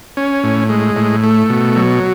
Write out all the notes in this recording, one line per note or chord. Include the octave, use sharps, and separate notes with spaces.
C#4
A2
G#3
A2
A3
B2
F#3